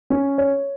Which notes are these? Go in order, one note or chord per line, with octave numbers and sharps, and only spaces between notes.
C#4
C#5